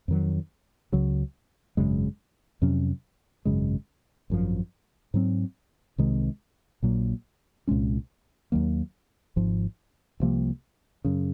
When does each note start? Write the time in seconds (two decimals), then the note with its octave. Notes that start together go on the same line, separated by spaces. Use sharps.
0.08 F2 D#3 F#3
0.92 C#2 C#3 F#3
1.77 G#1 F#2 C#3 G#3
2.62 F2 C3 F#3 C#4
3.45 G#1 F#2 C#3 G#3
4.30 G#1 F#2 F3
5.14 G#2 F#3 C4
5.98 C2 C3 D#3 G#3
6.82 A#1 A#2 F#3 A#3
7.68 C2 A#2 G#3 C#4
8.52 D#2 D#3 F#3 A#3
9.36 G#1 G#2 F3
10.20 C2 C3 F3 A#3
11.05 F#2 C#3